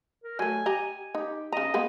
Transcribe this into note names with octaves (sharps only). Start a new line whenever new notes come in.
A#4
F#3 A3 G#5
G4 D#5 A#5
D#4 G4
C#3 D#5 A#5
G#3 A#3 B3